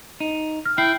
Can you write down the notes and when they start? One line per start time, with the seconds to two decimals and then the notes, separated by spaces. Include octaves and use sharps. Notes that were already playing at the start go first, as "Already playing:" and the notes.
0.20 D#4
0.65 F6
0.78 E4 G5 C7